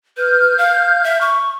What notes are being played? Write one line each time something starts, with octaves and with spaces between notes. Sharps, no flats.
B4 F6 G6
F5
E5
C#6